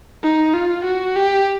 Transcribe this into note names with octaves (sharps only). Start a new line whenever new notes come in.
D#4
F4
F#4
G4